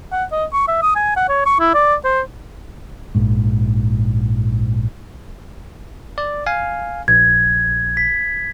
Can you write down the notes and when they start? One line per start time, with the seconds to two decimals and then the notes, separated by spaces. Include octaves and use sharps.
0.12 F#5
0.32 D#5
0.53 C#6
0.68 E5
0.82 D#6
0.95 G#5
1.16 F#5
1.29 C#5
1.46 C#6
1.60 E4
1.74 D5
2.04 C5
3.15 A#1 G#2
6.18 D5
6.46 F5 G#5
7.08 A#1 G#6
7.97 B6